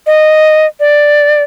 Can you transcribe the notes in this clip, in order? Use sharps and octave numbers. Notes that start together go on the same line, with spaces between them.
D#5
D5